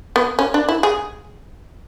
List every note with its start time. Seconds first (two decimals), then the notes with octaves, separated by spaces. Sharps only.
0.16 B3
0.39 C#4
0.54 D4
0.69 E4
0.83 G#4